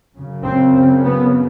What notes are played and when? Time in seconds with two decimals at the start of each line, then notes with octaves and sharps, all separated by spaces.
0.17 F#2 C#3
0.45 C4
0.74 C4
1.04 B3